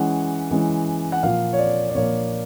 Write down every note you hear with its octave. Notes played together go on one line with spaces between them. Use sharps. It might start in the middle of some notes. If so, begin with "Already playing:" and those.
Already playing: E3 G#3 C#4 F#5
E3 G#3 C#4
F#5
A#2 F3 A#3 F5
C#5
D5
D5
A#2 F3 A#3 C#5